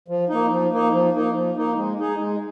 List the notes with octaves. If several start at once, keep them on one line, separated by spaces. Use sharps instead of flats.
F3
A#3 D#4
F3
A#3 D#4
F3
A#3 D#4
F3
A#3 D#4
G#3
D#4 G#4
G#3